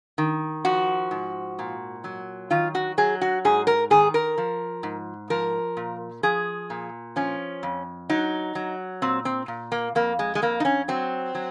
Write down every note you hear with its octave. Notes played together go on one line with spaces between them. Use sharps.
D#3
F3 F#4
G#2
A#2
F#3
D#3 F4
F#4
F#3 G#4
F#4
G#2 G#4
A#4
D#3 G#4
A#4
F3
G#2
F3 A#4
A#2
F3 G#4
A#2
F3 C#4
F2
F#3 D#4
F#3
A#2 C4
C4
A#2
A#3
F2 A#3
G#3
G#3
F2 A#3
D#4
C#4
F#3 C4
F#3